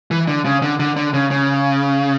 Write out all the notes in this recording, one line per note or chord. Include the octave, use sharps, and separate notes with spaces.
E3
D3
C#3
D3
D3
D3
C#3
C#3